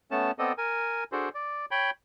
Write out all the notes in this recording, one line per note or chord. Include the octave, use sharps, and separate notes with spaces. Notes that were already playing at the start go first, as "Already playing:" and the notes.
A3 B3 C#4 A5
B3 C4 A4 D5 D#5
A#4 G#5
D4 F#4 G#4 A4 C5
D5
C#5 G5 B5